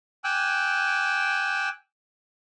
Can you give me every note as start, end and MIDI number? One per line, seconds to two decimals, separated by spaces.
0.24 1.69 79
0.24 1.69 80
0.24 1.69 86
0.24 1.69 88
0.24 1.69 90